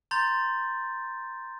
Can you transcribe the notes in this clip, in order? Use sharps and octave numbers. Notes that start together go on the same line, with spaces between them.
A#5 C6 G6 A6